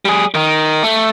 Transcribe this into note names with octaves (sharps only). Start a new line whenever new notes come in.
G3 G#4
D#3 D#4
A3